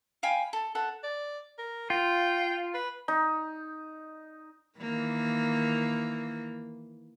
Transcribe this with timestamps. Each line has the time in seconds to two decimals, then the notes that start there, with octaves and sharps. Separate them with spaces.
0.23 F5 G5 G#5 B5
0.53 A4
0.75 A4 E5 F#5
1.04 D5
1.58 A#4
1.90 F4 G5
2.74 B4
3.08 D#4
4.79 D#3 E3 A#3